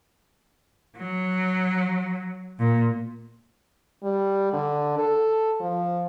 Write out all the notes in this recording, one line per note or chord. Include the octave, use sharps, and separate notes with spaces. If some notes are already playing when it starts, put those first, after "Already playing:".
F#3
A#2
G3
D3
A4
F3